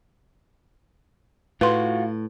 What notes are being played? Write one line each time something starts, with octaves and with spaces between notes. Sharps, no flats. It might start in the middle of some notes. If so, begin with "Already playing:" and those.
A2 F4 F#4 B4 C6